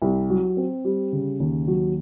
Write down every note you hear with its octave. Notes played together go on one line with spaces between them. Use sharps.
C2
F#3
C4
G3
C#3
D#2
F#3